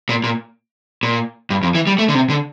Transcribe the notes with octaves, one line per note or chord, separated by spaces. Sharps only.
A#2
A#2
A#2
G2
F2
E3
G3
A3
D3
C3
D3